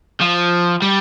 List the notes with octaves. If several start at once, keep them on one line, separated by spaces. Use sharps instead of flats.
F3
G3